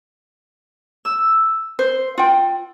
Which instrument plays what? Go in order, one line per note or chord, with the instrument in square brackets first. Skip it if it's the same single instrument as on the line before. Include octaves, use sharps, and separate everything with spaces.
[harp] E6
[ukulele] C5
F4 G5